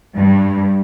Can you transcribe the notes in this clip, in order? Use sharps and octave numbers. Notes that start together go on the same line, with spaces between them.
G2